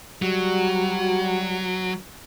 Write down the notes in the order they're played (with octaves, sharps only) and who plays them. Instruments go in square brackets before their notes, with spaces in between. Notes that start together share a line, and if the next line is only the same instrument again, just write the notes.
[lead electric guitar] F#3 [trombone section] G3 F#4